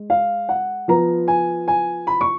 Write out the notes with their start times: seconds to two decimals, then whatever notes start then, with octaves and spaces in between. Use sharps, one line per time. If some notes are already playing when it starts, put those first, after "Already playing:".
Already playing: G#3
0.10 F5
0.49 F#5
0.88 F3 B3 A#5
1.28 G#5
1.68 G#5
2.07 B5
2.21 C#6